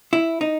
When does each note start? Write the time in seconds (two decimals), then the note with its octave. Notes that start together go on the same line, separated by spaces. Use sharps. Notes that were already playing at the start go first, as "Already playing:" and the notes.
0.13 E4
0.41 D#4